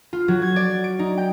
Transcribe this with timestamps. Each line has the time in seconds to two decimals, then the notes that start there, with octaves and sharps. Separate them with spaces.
0.13 F4
0.28 F#3
0.42 G#6
0.56 D5
0.84 D7
0.99 D#4
1.17 G5